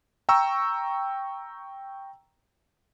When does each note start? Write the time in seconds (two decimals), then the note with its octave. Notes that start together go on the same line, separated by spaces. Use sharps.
0.29 G5 A#5 C#6 E6